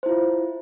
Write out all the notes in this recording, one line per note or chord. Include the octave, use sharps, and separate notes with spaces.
E4 F4 C5